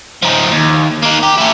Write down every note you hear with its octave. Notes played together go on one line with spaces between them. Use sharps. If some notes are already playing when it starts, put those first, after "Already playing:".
F3 D#4
D#2
A#3 D#4
G4
C#4 E4